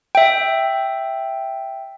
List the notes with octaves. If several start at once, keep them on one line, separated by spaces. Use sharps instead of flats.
E5 G5